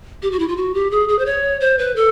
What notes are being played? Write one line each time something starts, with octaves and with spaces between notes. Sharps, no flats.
G4
F#4
E4
F4
F#4
G4
G#4
G#4
C5
C#5
C5
B4
A4